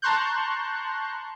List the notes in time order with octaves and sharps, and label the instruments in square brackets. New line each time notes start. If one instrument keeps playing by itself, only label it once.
[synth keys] A5 A#5 C6 C#6 F#6 G6